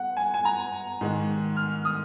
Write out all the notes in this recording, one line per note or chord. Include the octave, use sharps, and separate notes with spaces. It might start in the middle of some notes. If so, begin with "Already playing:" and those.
Already playing: F#5
G#5
G#5
A#5
G#2 D#3 G#3
F6
D#6